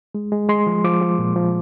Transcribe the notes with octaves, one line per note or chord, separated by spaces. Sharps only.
G#3
G#3
G#3 C6
F3
F3 D6
F3
A#2
F3